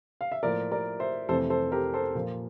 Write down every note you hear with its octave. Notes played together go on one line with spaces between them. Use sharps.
F5
E5
A2 F3 A#3 A#4 D5
A#4 D5
C5 E5
F2 C3 E3 A3 A4 C5
A4 C5
G4 A#4
A4 C5
A#2 F3 A#3